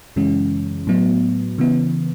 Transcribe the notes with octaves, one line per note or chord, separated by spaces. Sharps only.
F#2 C#3 E3 G#3 C#4
A2 F#3 B3
C#3 E3 B3